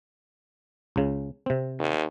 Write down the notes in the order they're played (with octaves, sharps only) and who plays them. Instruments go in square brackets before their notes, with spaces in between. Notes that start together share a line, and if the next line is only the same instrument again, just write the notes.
[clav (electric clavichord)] C#2 C#3
C3 C4
[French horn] D#2